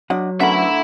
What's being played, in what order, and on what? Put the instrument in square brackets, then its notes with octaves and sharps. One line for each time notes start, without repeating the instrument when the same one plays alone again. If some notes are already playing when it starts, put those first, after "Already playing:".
[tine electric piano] F#3 [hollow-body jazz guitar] D4 D#5 F#5
[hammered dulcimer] D3 A3 A#4 [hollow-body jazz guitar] B3 C#4 F#5 [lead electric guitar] E5 B5